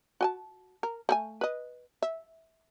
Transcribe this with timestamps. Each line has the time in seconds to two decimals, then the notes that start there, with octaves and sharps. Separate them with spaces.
0.21 F#4 G#5 A5
0.83 A#4
1.09 A3 A4 G#5
1.41 B4 D#5
2.02 E5